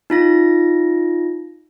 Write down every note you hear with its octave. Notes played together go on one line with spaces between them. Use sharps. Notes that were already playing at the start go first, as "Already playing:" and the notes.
D#4 F4 A#6